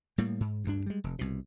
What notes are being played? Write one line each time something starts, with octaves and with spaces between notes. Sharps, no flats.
A2 G3 A#3
G#2
D2 G2 D4
G3 G#3
F1
C2 B2